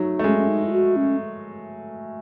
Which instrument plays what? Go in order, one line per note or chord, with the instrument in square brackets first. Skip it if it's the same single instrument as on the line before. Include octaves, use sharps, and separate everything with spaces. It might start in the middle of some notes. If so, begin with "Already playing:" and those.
Already playing: [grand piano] F#3 A3 [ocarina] D#4
[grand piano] A3
[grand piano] G#3 [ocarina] C#4
[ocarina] C#4
D#4
E4
F#4
C#4